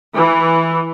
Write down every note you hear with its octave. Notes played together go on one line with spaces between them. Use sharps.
E3